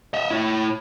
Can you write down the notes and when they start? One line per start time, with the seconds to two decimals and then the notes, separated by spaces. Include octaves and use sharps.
0.14 D#5 E5
0.31 E4 C#5